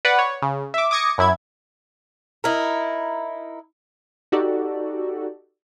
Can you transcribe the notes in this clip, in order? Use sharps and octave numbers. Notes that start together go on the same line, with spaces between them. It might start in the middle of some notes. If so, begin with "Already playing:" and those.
B4 D5 F#5
C#5
C#3
E5 D6
D6 D#6 G#6 A#6 C#7
F#2 E4 G#6
D#4 E4 A#4
D#4 F#4 G4 A4 D5